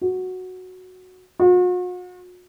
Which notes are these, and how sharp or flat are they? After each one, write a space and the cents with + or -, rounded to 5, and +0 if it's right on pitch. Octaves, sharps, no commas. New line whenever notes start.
F#4 -5
F#4 -45